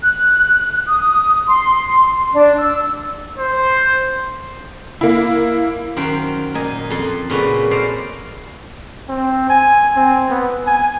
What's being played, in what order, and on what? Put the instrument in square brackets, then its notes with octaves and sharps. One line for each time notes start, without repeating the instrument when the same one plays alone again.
[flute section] F#6
D#6
C6
D4
E6
[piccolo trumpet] C5
[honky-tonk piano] A#3 E4
[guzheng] F#2 D#3 C5 G5
A#2 D#4 G#5
F2 A4 C6
A#2 C#3 C#4 E4 F#4 B4
A4 C5 D5 D#5 F5
[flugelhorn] C4
G#5
C4
B3
G#5